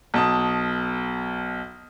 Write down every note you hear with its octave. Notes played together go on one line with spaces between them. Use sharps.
B1 A5 D#6